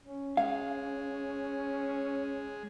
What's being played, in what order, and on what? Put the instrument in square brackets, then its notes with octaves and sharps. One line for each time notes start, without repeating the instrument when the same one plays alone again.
[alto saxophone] C#4
[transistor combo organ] G#3 [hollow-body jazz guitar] F5